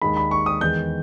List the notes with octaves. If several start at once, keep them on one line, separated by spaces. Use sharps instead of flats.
D#2 D#3 G#3 B5
B5
C#6
D#6
E2 D#3 G#3 G6